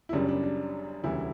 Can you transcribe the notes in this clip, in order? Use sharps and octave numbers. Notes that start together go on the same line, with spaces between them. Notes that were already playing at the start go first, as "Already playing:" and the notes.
E4
F#1 F#2 C#3 G3 D4
D4
D4
E1 D2 C#3 E3 G3 E4